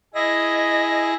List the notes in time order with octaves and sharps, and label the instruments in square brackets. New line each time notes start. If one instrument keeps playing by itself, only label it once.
[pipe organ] E4 G#4 A#6 [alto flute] D#5